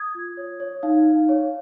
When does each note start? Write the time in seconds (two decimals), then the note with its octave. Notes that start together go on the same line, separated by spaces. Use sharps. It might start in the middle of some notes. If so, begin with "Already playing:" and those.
Already playing: D#6 G#6
0.15 F4
0.37 C#5
0.60 C#5
0.83 D#4 F5
1.06 D#4
1.29 C#5